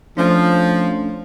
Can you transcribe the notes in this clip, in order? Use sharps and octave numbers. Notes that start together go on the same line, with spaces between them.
F3 A3 C#4 D4